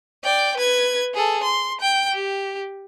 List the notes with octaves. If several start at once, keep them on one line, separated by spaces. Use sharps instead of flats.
D5 G5
B4 G#6
G#4 A4
C6
G5
G4